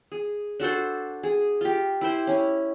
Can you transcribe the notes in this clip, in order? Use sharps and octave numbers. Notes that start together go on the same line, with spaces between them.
G#4
D4 F#4 A4 C5
G#4
F4 G4
E4 G4 C5
C#4 E4